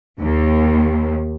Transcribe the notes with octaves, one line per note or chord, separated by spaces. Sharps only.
D#2